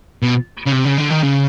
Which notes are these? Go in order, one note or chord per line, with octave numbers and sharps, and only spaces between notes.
B2
C#3
C3
C#3
D3
D#3
C#3